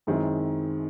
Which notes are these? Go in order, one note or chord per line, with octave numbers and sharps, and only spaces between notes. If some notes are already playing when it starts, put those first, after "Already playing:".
F#2 D#3 G#3 C4 E4